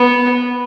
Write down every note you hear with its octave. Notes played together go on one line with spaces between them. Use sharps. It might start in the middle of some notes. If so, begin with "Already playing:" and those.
Already playing: B3